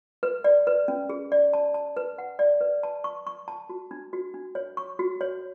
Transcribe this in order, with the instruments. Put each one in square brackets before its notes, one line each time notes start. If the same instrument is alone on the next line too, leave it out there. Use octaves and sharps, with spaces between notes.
[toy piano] B4
D5
B4
C#4
G#4
D5
A5
A5
B4
F#5
D5
B4
A5
C#6
C#6
A5
F#4
D4
F#4
D4
C#5
C#6
F#4
C#5